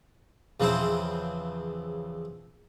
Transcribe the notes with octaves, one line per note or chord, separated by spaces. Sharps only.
E2 C#3 F3 C4 E4 C5